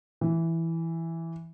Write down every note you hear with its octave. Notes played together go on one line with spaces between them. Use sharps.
E3